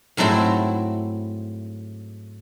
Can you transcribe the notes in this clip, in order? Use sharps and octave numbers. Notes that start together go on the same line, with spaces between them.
G#2 F#3 A3 C4 E4